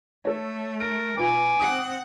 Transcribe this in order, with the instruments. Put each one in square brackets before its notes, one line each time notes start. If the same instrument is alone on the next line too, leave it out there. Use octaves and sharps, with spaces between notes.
[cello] A3 [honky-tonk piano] A4 C#5
[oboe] A#4 [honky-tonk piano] D7
[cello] B2 [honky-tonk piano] F4 B4 [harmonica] G#5 [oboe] D6
[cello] C4 F#5 [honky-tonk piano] D#6